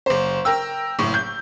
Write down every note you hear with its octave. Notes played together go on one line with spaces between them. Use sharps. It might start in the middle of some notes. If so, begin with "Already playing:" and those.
F#1 C5
A#4 G5 E6
F#1 A2
G6